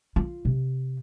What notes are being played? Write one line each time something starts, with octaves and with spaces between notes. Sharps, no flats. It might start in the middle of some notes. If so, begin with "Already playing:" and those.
F4
C3